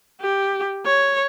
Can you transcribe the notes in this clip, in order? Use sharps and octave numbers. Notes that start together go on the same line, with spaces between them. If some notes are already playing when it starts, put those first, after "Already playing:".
G4
C#5